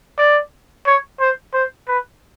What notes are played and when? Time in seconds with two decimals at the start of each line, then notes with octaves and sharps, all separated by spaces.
0.18 D5
0.86 C#5
1.20 C5
1.54 C5
1.88 B4